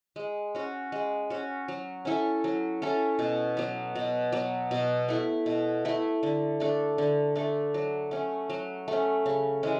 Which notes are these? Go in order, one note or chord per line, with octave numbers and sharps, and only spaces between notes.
G#3
C#4 F#4
G#3
C#4 F#4
F#3
C#4 E4 A4
F#3
C#4 E4 A4
B2
F#3 B3
B2
F#3 B3
B2
A3 E4
B2
A3 E4
D3
A3 D4 A4
D3
A3 D4 A4
F#3
A3 C#4
F#3
A3 C#4
C#3
E3 G#3 C#4